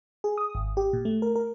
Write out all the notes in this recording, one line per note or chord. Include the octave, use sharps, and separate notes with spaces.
G#4
D#6
G#1
G4
A#2
A3
A#4
A#4